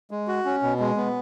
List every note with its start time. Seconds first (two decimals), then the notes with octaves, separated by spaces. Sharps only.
0.11 G#3
0.28 F#4
0.45 C#4
0.63 B2
0.80 G#3
0.97 B3